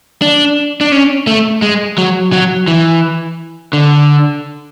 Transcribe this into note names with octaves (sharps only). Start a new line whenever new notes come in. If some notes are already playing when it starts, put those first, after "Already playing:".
D4
D4
C#4
A3
G#3
F#3
F#3
E3
D3